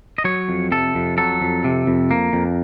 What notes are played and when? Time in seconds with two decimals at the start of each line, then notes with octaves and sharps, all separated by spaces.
0.18 D#5
0.24 F#3 C#5
0.49 F2
0.72 C3 A4
0.95 F2
1.18 F#3 A4
1.42 F2
1.64 C3
1.87 F2
2.11 A#3
2.33 F2